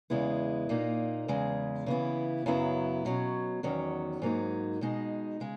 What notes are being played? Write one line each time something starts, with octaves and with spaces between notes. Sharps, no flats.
E2 C#3 G#3 B3 E4
A#2 A#3 D#4
E2 C#3 G#3
C#3 E3 B3 E4
F#2 C#3 F#3 B3 E4
B2 F#3 C#4
E2 D#3 F#3 C#4
G#2 F#3 A#3 D#4
B2 G#3 D#4
C#3 G#3